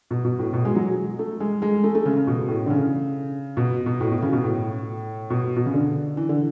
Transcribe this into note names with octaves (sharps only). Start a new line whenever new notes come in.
B2
B2
A2
B2
G#3
F#3
A3
G#3
G#3
A3
A3
C#3
C#3
B2
A2
D3
C#3
B2
B2
A2
B2
C#3
B2
A2
B2
B2
C#3
D3
E3
D3